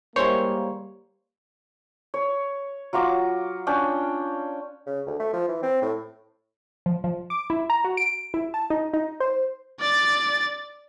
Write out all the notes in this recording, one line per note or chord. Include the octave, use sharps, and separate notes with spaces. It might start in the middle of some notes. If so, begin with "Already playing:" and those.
G3 G#3 A#3 E4 C5 C#5
C#5
F#3 F4 A#5 D6
C#4 D4 G5
C#3
D2
A3
F3
E3
C4
A2
F3
F3
D6
E4
A#5
F#4
D7
E4
A5
D#4
D#4
C5
D5 A6